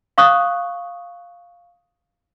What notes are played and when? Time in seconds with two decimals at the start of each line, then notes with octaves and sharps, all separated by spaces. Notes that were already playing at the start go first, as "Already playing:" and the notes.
0.18 F5 C#6 D#6 F#6